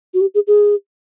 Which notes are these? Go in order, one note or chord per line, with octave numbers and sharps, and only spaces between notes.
F#4
G4
G#4
G#4